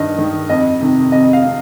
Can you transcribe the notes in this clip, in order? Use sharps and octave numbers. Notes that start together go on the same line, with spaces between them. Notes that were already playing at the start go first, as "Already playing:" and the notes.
Already playing: G2 D#3 D#5
D#3
F2 D#5
C3 D#3
F2 D#5
F5
C3